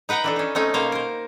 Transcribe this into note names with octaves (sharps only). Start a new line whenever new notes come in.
D#4 B4 F#5 G5 A#5
E3 D4 A4
C#4 D#4
A3 C4 C#4 D#4
B2 A#3 C#4 C5 F5
A#4 C5